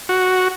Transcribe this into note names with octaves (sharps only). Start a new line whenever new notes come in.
F#4